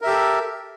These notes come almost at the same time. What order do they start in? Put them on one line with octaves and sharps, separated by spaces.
A#4 E5 G4 A4